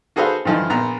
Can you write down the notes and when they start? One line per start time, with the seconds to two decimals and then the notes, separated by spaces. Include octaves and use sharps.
0.16 F#4 G#4 A4 B4 C5 F5
0.45 G2 D3 E3 F3 D#4 F4
0.70 A#1 B3 A#5